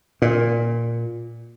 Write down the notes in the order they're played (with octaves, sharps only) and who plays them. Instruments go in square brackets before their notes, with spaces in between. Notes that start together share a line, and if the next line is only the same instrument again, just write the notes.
[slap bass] A#2